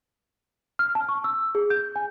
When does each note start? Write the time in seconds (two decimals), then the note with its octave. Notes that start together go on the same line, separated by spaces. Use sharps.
0.79 F6
0.95 A5
1.09 C#6
1.24 E6
1.55 G#4
1.70 G6
1.96 G#5